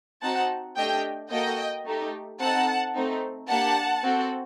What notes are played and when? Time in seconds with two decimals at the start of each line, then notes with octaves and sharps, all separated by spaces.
0.22 C4 D#4 F#4 F#5 A5
0.76 A3 D4 G4 D#5 G5
1.30 A#3 F#4 A4 D#5 G5
1.86 A3 D#4 G4
2.39 C4 D#4 A4 F#5 A5
2.94 A3 C4 D#4
3.49 A#3 D4 G4 F#5 A5
4.03 C4 F#4 A4